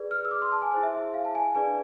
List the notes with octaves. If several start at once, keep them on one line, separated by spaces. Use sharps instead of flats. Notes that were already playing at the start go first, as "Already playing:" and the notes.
Already playing: G#4 B4 D5
F6
E6
D6
C6
A5
G#5
E4 G#4 C5 G#5
E5
F5
A5
G#5
D4 G#4 B4 D5 G#5